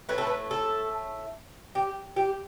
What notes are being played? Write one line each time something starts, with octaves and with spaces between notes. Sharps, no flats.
A2 A3 B4
A4
B4
A4
G4
G4